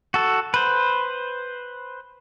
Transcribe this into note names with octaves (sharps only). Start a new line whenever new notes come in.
F#4 A4
B4 C5